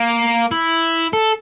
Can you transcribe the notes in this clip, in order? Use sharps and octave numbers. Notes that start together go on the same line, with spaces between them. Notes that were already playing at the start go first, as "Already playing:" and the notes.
Already playing: A#3
E4
A4